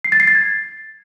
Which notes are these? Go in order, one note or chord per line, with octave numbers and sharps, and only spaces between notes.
C7
A6
C7
A6
G#6